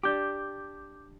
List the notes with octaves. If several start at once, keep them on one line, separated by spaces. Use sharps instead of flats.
D4 G4 D6 G6